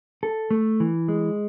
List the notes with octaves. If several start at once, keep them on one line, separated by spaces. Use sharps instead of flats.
A4
A3
E3
G#3